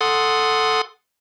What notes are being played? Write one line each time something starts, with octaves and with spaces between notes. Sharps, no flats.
A4 F#5 C6 D#6